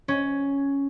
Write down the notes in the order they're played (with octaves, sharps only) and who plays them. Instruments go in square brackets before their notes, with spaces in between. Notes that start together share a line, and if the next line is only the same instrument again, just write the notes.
[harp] C#4